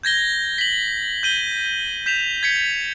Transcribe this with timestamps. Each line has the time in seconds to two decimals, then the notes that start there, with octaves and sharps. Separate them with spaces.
0.03 G6 G#6 A#6 G7
0.58 B6 F#7
1.23 G6 D#7 G7
2.06 G6 B6 E7 F7
2.43 G#6 B6 C#7